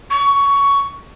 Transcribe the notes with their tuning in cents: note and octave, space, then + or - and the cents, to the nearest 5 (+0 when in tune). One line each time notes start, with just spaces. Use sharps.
C#6 +15